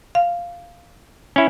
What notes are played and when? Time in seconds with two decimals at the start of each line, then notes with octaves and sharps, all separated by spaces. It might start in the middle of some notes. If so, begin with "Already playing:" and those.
0.15 F5
1.36 C#4 E4